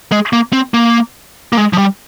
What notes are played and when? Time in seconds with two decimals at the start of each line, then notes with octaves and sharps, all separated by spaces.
0.12 G#3
0.33 A#3
0.53 C4
0.74 A#3
1.53 A#3
1.57 G#3
1.73 F3
1.78 G3